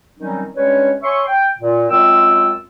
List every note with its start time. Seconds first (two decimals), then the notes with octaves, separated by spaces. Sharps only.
0.19 D#3 F#3 G3 C4 C#4 D#4
0.55 G3 G#3 C#4 D4 B4 C#5
1.03 C#5 E5 G#5 C6 C#6
1.26 G5
1.59 A#2
1.90 F#2 G#3 C4 F4 G5 E6